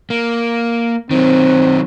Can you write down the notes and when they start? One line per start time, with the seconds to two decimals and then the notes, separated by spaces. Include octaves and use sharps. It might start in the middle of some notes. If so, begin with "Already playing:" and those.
0.10 A#3
1.11 D#3 F#3 C4